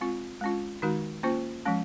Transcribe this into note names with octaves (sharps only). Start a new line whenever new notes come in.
G#3 C4 F4
G#3 C#4 F4
D#3 G#3 D#4 F#4
A#3 C#4 F4 C5
F3 G#3 C#4